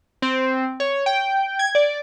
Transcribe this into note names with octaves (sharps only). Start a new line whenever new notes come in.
C4
C#5
G5
G#6
D5